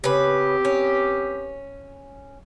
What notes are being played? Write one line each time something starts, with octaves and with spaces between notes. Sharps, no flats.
C#3 B3 C4 G4 B4
C#4